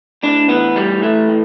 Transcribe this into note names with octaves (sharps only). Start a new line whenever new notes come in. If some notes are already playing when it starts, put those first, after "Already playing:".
A2 D4
E3 B3
A2 G3
E3 A3
A2